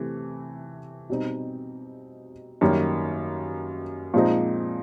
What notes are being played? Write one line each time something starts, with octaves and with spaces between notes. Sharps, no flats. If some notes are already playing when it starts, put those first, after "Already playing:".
Already playing: C3 E3 A3
B2 G3 C4 D#4
F#2 D#3 G3 A#3
A#2 F3 G#3 C4 D#4